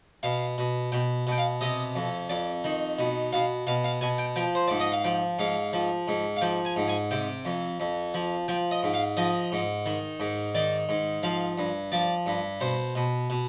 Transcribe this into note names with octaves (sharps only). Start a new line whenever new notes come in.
B2 F5
B2
B2 G5
B2 G5
F5
C3 D#5
F2
F2 D5
D#3
B2
B2 F5
B2 F5
F5
B2 G#5
G5
F3 G5
C5
G#2 D5
D#5
F5
F3 G5
G#2 F5
F3
G#2
F5
F3 G5
G#5
G#2
G#5
C3 G5
F2
F2
F3
F3 G5
D#5
G#2
F5
F3 D#5
G#2
D#3
G#2
D#3 D5
G#2
F3 F5
G2
F3 D5
G2
B2 C5
B2
B2